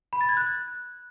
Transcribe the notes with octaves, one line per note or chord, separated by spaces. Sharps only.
B5
A6
G#6
F#6